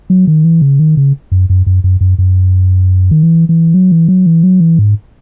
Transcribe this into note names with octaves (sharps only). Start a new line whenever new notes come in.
F#3
D#3
E3
C#3
D#3
C#3
F#2
F#2
F#2
F#2
F#2
F#2
D#3
E3
E3
F#3
E3
F#3
E3
F#3
E3
G#2